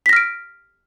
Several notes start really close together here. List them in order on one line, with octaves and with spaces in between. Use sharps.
B6 A#6 F6 D7